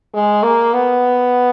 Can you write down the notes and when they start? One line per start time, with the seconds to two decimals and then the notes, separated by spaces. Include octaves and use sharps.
0.14 G#3
0.43 A#3
0.74 B3